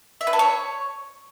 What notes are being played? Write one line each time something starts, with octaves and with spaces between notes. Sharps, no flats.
E5
B4
A4
C#5